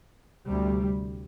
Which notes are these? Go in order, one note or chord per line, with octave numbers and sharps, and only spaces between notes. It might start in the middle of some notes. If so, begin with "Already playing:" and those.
D2 C3 G3